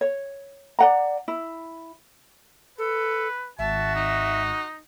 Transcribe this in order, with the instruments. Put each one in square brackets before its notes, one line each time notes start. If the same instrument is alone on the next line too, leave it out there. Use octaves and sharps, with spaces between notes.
[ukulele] C#5
D5 F#5 A#5
E4
[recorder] A4 [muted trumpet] B4
[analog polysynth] G#1 [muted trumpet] F#4 [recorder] E5 [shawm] A5
[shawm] D#4